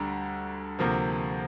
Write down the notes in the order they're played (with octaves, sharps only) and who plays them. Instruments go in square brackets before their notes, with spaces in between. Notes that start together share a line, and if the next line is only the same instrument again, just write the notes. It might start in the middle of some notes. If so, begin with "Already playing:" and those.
Already playing: [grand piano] D2 D3 G3 A#5
D2 C3 F3 A#3